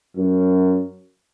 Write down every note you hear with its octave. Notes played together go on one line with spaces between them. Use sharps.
F#2